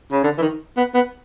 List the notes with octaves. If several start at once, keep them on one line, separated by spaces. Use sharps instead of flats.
C#3
D3
E3
D#3
B3
B3